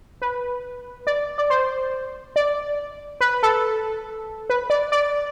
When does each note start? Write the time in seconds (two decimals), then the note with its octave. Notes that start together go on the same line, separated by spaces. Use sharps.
0.22 B4
1.07 D5
1.38 D5
1.50 C5
2.36 D5
3.21 B4
3.43 A4
4.50 B4
4.70 D5
4.92 D5